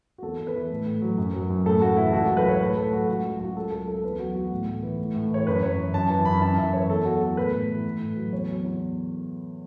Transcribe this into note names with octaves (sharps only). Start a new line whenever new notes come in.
F#4
E2 A4
E2
B4
E3
A2
A2
F#3
F#2
F#3
F#2
A2 A4
A2 F#4
E3 E4
A4
C#2 F#4
F#3 A4
B4
C#2 C#5
A2 B4
A2 A4
F#3 F#4
C#2 F#4
F#3
C#2 F#4
C#2 A4
F#3 A4
C#2 A4
E2 B4
F#3 F#4
E2 F#4
A2
A2
E3
A2
A2
E3 C#5
F#2 B4
F#2 C#5
E3
F#2 A5
E3 A5
F#2 B5
F#2 A5
F#2 E5
E3 C#5
E2 A4
F#3 F#4
E2 A4
A2 B4
A2
E3
A2
A2
F#3
E2 C#5
F#3
E2